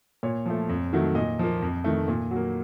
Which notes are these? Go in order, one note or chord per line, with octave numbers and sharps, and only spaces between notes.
A#2 C#5
F3 A3
F2
D#3 F#3 A3
A#2 D#5
F3 A#3
F2
D#3 A3
A#2
F#3 A#3